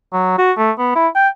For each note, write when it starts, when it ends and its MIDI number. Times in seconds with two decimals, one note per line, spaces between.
0.13 0.37 54
0.38 0.52 66
0.57 0.71 57
0.78 0.95 59
0.95 1.08 64
1.15 1.28 79